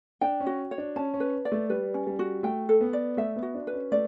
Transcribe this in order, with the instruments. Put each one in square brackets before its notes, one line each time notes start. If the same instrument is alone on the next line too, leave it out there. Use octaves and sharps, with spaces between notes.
[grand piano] D4 [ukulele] G5
[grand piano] C#4
[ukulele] F#4
C#5
[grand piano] D4
[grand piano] C#4 [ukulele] A5
[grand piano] C#4
[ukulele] B4
D5
[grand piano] A3
[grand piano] G3 [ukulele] B4
[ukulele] C#4
[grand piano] G3
[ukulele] F#4
[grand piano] A3 [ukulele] G5
[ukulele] A4
[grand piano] B3
[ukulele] D5
[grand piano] A3 [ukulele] E5
[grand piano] B3
[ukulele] F#4
[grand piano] D4
[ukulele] B4
[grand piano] C#4
[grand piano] A3 [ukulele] D5